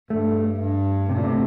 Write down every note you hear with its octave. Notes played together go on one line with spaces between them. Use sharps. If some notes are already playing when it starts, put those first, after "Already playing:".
G2 A3
G2
A2 C3
A#2
C3